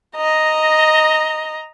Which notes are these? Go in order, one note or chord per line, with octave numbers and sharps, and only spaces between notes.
D#5 A#5